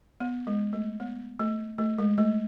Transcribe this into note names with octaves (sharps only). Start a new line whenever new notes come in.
B3
G#3
A3
B3
A3
A3
G#3
A3